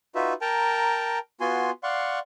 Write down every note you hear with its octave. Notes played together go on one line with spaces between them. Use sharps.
D#4 F4 F#4 B4 E5
A#4 G5 A5 A#5
B3 F4 F#4 G#5 C6
D5 F5 F#5 C6 C#6